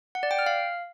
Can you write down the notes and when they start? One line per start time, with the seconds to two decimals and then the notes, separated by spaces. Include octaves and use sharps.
0.15 F#5
0.23 D5
0.31 G5
0.39 F6
0.46 F5